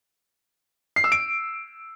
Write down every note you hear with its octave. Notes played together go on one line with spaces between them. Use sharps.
C7
E6
D7